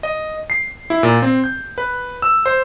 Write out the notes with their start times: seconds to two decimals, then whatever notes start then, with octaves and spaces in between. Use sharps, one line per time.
0.03 D#5
0.50 C7
0.90 E4
1.03 A#2
1.22 C4
1.44 G6
1.78 B4
2.22 E6
2.46 C5